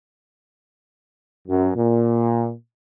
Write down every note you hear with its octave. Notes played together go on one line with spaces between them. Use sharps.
F#2
A#2